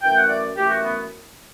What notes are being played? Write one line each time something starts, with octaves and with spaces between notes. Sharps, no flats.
F#2 E3 A3 G5
F#5
D5
F#2 E3 A3 G4
F#4
B3